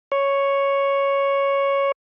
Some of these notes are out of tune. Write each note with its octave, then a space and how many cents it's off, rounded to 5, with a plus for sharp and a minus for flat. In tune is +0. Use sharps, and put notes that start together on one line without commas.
C#5 +0